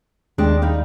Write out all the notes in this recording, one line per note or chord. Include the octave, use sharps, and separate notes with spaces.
D#2 G#3 D4 G4
G3 D#4 F5